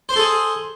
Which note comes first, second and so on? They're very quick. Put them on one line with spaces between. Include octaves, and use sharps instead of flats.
C5 C6 A4 G#4